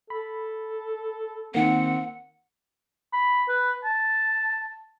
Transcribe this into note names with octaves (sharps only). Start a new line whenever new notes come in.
A4 B5
D#3 A#3 C4 F#5
B5
B4
A5